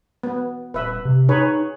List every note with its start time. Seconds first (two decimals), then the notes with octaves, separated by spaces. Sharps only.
0.23 B3
0.74 D#1 B4 E5
1.05 C3
1.29 D#4 G#4 B4 C#5